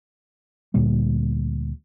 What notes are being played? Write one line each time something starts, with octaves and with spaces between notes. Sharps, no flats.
D2 A#2 G3 A#3